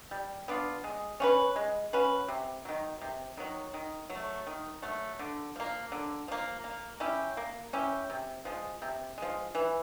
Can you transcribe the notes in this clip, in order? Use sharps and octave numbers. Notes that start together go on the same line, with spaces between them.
G3
B3 D4 F4
G#3
C#4 F#4 B4
G#3
C#4 F#4 B4
C3
D#3 F#3
C3
D#3 F#3
D#3
F#3
A3
D#3
F#3 A3
D3
F3 A#3
D3
F3 A#3
A#3
C#4 E4 G4
A#3
C#4 E4 G4
C3
F3 G#3
C3
F3 G#3
E3